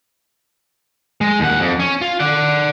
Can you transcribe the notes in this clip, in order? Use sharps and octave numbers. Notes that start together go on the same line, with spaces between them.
G#3
D#2 F#5
F2
C#4
F4
D5 F#5